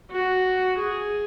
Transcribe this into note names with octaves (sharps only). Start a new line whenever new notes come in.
F#4
G#4